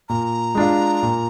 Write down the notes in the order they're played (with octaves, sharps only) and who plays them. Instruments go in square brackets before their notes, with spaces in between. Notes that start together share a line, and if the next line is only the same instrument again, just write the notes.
[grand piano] A#2 [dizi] A#5
[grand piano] G#3 D4 F4
A#2